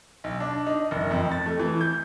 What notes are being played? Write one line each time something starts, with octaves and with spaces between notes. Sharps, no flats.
B1
D4
D#4
F#1
F2
A6
A3
E3
G6